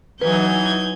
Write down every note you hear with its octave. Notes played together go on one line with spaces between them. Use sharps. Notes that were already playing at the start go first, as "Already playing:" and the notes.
E3 F#3 D#4 B4 G6 G#6